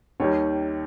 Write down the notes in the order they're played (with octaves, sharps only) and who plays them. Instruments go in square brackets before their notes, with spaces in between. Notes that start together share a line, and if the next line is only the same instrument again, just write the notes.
[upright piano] D#2 D#3 G3 C#5